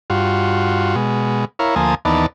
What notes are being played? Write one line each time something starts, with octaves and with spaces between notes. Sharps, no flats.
G2 F4 F#4
B2 G#3
E4 A#4 C#5 F5
D2 F3 A#3 G#5 A5 D#6
D#2 E3 B3 D#4 D5 A5